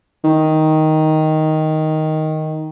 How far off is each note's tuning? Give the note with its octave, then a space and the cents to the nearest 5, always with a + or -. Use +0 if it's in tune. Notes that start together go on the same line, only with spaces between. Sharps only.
D#3 +5